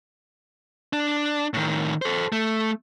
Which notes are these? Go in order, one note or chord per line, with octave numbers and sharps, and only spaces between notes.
D4
A2 D#3
A4 C5
A3